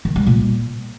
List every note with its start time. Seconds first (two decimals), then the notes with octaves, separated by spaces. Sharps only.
0.05 D#3
0.16 G3
0.27 A#2